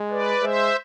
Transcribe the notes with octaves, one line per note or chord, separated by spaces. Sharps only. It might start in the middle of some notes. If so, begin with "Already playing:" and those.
Already playing: G#3
B4 D5
G#3 C5 E5